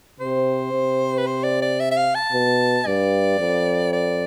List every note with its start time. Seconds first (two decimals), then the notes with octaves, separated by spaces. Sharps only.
0.20 C3 C5
0.73 C3
1.18 B4
1.27 C5
1.44 D5
1.62 D5
1.80 E5
1.91 E5
1.97 F5
2.15 A5
2.33 B2
2.86 G2 D5
3.39 F2
3.93 D5